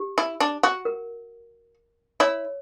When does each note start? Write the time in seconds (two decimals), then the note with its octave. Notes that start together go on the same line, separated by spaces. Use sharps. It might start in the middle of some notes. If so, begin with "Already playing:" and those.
Already playing: G4
0.18 E4
0.40 D4
0.63 F#4
0.85 A#4
2.20 E4 C#5